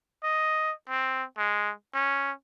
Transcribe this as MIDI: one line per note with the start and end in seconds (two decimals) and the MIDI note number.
0.24 0.73 75
0.89 1.24 60
1.38 1.72 56
1.94 2.31 61